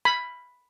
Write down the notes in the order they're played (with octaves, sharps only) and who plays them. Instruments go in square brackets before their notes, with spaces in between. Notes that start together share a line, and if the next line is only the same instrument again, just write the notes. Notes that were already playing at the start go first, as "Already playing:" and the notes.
[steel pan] B5